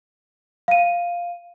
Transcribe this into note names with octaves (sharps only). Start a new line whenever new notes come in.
F5 D#7